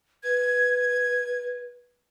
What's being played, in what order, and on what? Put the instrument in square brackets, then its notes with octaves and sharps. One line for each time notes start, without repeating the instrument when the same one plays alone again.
[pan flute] B4 [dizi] G#6